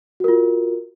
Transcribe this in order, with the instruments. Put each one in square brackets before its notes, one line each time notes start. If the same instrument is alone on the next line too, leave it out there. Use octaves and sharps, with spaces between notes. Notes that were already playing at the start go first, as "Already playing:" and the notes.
[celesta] F#4
A#4
F4